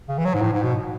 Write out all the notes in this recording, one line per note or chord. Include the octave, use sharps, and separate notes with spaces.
C#3
E3
F#3
G#2
A2
G#2
B2